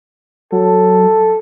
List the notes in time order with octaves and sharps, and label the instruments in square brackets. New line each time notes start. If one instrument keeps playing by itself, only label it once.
[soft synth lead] F#3 [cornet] A4